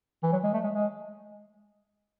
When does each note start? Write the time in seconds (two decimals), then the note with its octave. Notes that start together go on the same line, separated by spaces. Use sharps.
0.23 E3
0.32 F#3
0.44 G#3
0.54 A3
0.64 G#3
0.74 G#3